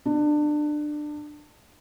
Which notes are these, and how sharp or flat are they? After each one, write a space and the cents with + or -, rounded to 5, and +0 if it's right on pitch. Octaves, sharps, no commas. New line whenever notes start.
D4 +25